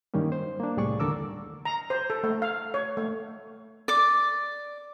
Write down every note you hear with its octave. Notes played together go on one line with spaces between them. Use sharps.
G2 D#3 G3 A#3 C#4
C5
A#3 D4
C2 A2 G3 G#4 D5 C#6
D#2 D3 A4 A#4 D6 E6
A#5
C5
A4
A3
F5
C#5
A3
D5 D6